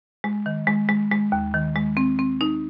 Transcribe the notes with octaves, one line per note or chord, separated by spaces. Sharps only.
G#3
D#3
G#3
G#3
G#3
D#2
D#3
G#3
C4
C4
D#4